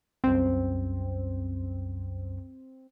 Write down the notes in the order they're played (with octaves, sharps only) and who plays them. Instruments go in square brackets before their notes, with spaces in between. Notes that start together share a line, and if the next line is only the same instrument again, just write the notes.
[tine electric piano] C2 F#2 [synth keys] C4